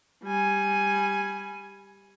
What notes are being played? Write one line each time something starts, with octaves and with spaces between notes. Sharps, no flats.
G3 G#5